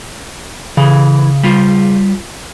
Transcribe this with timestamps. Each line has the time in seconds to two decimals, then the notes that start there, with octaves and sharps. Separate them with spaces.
0.77 C#3 E3
1.43 G3 F4